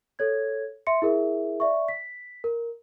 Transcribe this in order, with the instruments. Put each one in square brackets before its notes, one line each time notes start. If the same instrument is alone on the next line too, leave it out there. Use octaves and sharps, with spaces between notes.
[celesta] A4 C#5 G#6
E5 C6 C#7
E4 G#4 A#4 E5
D5 E5 C#6
B6
A#4